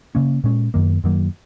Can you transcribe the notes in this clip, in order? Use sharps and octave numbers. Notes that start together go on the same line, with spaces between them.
C#3 A#3 C#4
A#2 G#3 C#4
F#2 D#3 A#3
F#2 D#3 F#3 A#3